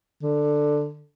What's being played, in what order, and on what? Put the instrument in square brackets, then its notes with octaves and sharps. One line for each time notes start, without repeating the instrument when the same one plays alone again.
[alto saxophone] D3